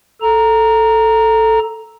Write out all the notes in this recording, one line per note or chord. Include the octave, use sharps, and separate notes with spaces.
A4 A#5